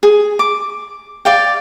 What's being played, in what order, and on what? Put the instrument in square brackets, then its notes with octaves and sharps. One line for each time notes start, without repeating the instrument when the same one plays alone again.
[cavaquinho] G#4
D6
D5 F5 G5